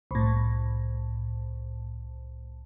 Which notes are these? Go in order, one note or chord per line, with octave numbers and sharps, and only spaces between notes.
C2 A2